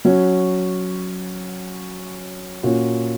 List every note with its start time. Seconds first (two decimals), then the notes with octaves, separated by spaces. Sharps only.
0.05 F#3 C#4 F#4
2.63 A#2 A#3 C#4 F#4